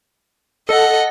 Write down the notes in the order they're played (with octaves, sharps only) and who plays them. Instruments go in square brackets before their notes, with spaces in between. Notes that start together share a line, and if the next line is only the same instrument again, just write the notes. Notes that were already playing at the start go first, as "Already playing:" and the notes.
[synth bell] A4 [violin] D#5 F#5